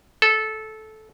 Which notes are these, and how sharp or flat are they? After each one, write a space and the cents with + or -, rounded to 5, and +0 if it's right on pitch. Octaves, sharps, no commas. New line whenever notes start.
A4 -15